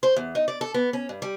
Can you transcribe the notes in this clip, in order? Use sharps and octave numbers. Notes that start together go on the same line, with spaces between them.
C5
E2
D#4
D5
A4
B3
C#4
G2
G3